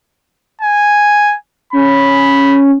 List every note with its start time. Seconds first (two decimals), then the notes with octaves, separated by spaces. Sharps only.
0.62 G#5
1.73 C#4 B5